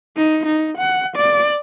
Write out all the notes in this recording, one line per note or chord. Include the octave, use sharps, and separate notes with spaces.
D#4
D#4
F#5
D5